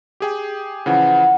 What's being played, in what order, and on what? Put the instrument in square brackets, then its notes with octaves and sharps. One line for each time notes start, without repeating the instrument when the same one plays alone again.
[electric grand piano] G4 G#4 G5
[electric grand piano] C#3 E3 F3 [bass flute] F#5